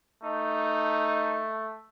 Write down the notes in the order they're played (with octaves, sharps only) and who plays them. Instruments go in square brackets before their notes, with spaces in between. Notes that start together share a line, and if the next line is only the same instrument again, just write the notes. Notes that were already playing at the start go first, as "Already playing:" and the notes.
[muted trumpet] A3 [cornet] D#4